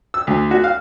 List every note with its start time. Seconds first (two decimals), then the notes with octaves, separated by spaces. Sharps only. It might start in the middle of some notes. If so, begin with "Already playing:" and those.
0.14 E6
0.27 D2
0.51 F#4
0.64 F5